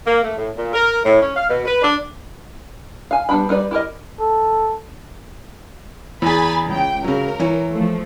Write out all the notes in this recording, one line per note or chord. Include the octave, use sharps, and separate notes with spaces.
A#3
A3
A2
A#2
A#4
A2
C#4
F5
B2
B4
D4
F5 G#5
G3 B3 D4 G5 B5
G3 D#4 B4 D5
E4 G4 A#4 D#5
A4
E2 G#4 G#5 B5 A6
C#2 G5
C#3 F#3 A#4
E3 C#5
F3 A3